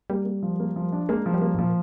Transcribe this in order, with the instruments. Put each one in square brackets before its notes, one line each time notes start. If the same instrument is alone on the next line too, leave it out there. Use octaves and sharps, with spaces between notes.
[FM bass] G3 [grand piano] A#3
[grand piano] A#3
F3
A#3
F3
D4
[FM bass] G#3 [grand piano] A#3
[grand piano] F3
[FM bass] G3
[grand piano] A#3
[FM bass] G#2
[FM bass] A#2 [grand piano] F3